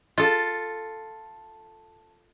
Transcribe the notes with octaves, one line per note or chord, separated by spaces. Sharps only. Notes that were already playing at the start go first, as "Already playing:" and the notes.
F4 A4